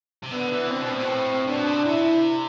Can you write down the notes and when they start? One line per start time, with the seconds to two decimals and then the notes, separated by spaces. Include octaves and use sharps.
0.23 C3
0.31 D3 B3
0.51 E3
0.70 D3 C4
0.80 B2
0.89 A2
0.99 B2
1.09 A2
1.46 B2 D4
1.67 C3
1.85 C3 E4